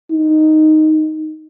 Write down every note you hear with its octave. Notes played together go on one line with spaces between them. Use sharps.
D#4